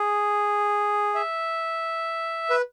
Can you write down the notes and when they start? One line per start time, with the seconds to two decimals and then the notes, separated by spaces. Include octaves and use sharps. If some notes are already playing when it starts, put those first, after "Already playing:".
Already playing: G#4
1.15 E5
2.50 B4